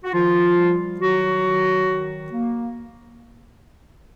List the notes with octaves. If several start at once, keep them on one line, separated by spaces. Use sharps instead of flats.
F#4
D#3 F3 F4
G3
D#3 F#3 F#4
D#3
D#3
A#3